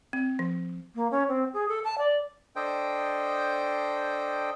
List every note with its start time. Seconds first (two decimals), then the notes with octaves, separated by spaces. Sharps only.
0.13 C4
0.39 F3
0.95 A#3
1.11 C#4
1.28 C4
1.53 G#4
1.68 A4
1.84 A5
1.98 D5
2.56 D4 A4 C5 D#5 G5